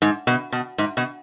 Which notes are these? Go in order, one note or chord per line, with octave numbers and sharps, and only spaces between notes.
G#2
B2
B2
G#2
B2